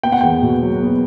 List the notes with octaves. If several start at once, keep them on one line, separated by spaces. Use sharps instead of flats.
B3 G5
F#5
E2 G5
B2
F#3
B3